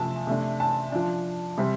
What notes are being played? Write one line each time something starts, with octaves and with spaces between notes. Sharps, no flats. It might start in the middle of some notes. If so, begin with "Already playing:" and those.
Already playing: C3 F3 A3 A5
C3 A3 D4
A5
F3 D4
C3 G3 C4